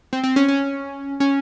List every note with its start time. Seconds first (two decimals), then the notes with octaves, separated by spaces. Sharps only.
0.13 C4
0.24 C4
0.36 C#4
0.48 C#4
1.20 C#4